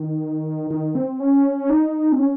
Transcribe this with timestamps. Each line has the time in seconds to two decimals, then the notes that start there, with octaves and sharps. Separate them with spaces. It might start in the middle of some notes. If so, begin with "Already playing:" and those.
Already playing: D#3
0.71 D#3
0.95 C4
1.20 C#4
1.70 D#4
2.12 C4
2.19 C#4